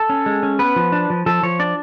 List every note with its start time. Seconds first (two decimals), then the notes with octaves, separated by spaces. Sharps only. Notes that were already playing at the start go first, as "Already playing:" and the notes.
Already playing: A4
0.09 C#4
0.26 G#3
0.43 C#4
0.59 B3 B4
0.76 F3
0.92 D4
1.10 F3
1.26 F3 A4
1.43 F3 C#5
1.59 D4 D5